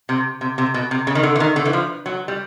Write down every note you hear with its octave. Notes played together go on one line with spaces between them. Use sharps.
C3
C3
C3
B2
C3
C#3
D#3
D3
E3
D#3
D3
E3
F3
F#3
G3